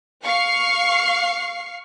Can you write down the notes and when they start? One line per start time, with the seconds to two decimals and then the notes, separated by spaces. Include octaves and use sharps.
0.23 F5 C#6 F6 C7